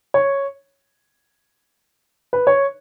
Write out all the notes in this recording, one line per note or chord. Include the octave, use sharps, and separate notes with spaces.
C#5
B4
C#5